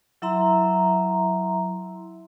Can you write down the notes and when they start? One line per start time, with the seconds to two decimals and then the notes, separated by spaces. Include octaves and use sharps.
0.22 F#3 E4 E5 A#5 C6